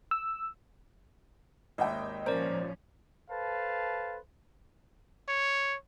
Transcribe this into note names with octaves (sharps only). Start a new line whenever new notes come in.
E6
G#1 D#2 D#5 E5 G5
A#2 F3 C#4 A#4 C5 D5
A4 B4 C5 F5 A5
C#5